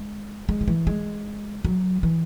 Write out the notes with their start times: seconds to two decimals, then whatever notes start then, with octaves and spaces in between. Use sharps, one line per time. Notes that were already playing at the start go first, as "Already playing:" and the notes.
Already playing: G#3
0.49 G#3
0.61 D#3
0.68 E3
0.87 G#3
1.65 F#3
2.03 E3